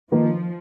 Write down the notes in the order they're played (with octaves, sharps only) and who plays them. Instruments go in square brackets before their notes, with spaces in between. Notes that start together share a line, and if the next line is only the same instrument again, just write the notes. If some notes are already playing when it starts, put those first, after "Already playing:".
[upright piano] D#3 A#3 F4 [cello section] F3